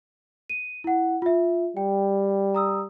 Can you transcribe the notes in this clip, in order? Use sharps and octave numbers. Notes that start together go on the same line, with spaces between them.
D#7
E4 F#5
F4 E5
G3 G5
A#5 D#6 E6